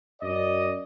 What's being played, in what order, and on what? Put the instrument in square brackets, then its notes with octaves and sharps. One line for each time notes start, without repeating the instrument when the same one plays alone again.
[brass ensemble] F#2 D5 D#5